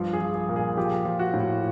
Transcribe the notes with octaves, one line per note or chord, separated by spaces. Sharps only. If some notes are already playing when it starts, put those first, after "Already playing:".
Already playing: G2 F3
G#4
F3
G#4
A#2
G#4
F3 G4
F3
F#4
A2